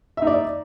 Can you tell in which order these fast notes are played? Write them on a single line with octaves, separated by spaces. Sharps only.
E5 D#4 D5